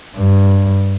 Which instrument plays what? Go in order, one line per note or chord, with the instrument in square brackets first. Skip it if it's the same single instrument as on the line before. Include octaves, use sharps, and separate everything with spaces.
[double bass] G2